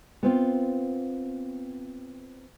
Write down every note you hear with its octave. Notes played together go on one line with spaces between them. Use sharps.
B3 C4 F4